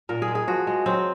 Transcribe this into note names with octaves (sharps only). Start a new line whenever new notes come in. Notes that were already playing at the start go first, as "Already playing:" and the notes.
A#2 A#4
G#4
G#3
G#4
F3 F#4
G#3
F#3 C4